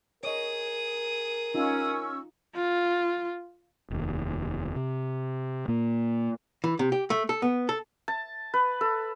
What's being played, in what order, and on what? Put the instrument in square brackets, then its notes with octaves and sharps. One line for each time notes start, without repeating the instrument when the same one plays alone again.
[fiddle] G#4 D#6 [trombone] A#4 [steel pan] C#5 D#5
[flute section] C#4 C#6 E6 [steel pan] D#4 F4
[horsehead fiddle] F4
[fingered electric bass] F1 D#2
C3
A#2 A#3
[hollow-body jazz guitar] E3
C3
G4
A3
A4
B3
A4
[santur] A5
B4
A4